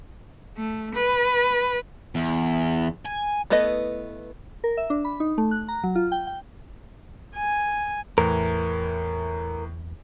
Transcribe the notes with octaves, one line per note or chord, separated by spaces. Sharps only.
A3
B4
E2
G#5
A3 B3 E4 B4 D#5
A#4
E5
D4
B5
D#4
A3
F#6
A#5
F#3
F4
G5
G5
G#5
E2 A2 E3 A#4